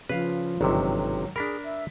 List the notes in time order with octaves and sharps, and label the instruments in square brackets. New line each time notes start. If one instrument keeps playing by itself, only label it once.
[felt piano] C#3 [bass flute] F3 [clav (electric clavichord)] B4 F5
[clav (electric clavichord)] G1 C3 [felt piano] G#2 D#3 F#3
[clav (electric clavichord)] D4 A#4 [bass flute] G#4 [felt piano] B5 B6
[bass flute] E5